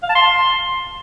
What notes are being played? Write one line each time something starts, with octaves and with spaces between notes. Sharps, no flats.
F5
A5
C6